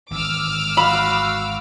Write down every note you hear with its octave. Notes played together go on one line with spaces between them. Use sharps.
G#1 D#3 E3 D6 E6 F6
F#4 F5 B5